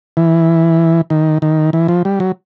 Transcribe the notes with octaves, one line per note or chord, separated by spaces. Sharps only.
E3
D#3
D#3
E3
F3
G3
F#3